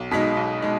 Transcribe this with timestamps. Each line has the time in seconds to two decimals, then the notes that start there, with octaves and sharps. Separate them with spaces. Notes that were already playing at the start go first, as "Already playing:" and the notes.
Already playing: B1
0.11 B2 G#3 D#4 B6
0.37 B1
0.62 G#3 D#4